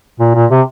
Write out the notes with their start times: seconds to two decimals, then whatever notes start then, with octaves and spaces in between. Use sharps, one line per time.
0.20 A#2
0.35 A#2
0.51 C3